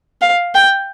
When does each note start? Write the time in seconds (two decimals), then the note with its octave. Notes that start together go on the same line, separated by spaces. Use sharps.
0.21 F5
0.55 G5